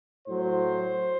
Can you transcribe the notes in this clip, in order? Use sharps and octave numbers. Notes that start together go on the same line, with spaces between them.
A2 F#3 C5